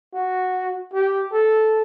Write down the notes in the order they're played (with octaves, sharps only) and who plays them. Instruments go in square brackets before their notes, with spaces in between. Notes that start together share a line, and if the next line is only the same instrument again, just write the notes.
[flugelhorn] F#4
G4
A4